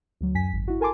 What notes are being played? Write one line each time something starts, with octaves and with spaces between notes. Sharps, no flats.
D2 F#3
F#2 G#5 B6
G#1
E4 F#4
A4 A#4 G#5 A5 C6 D6